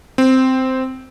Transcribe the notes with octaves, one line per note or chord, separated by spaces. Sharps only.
C4